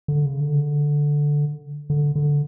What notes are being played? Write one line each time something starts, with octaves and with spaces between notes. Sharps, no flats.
D3
C#3
D3
D3
D3